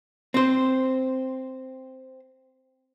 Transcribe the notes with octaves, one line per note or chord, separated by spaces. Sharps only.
C4 C5